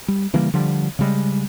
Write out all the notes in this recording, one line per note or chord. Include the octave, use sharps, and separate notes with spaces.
G3
C#3 E3 G3 A#3
D3 F3 G3
C#3 G3 G#3